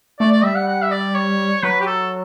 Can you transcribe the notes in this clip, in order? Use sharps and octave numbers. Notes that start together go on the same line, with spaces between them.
A3 D5
D5
G3 E5
F#5
F#5
E5
D5
C#5
F#3 B4
G4
A4